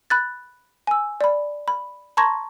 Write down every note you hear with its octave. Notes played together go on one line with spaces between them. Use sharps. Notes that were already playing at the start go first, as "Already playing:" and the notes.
B5 F#6 A6
G#5 E6
D5 B5
B5
A5 A#5 C6 C#6 G#6 A#6